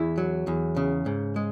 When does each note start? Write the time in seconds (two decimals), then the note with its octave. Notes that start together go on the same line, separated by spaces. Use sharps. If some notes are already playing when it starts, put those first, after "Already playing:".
Already playing: E2 E4 E5
0.18 F#3
0.47 E2
0.76 C#3
1.06 G#2
1.36 G#3